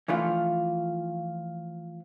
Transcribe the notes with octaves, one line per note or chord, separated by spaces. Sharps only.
E3 F3 A3 D4 F4